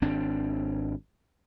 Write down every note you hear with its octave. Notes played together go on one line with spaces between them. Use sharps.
G#1 C4 D4